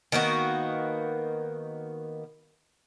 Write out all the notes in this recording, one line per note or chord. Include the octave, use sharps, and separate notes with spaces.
D#3 A#3 B3 F#4